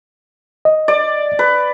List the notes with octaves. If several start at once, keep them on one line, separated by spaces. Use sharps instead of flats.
D#5
D5
B4